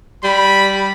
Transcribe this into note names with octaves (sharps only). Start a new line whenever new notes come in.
G3 B5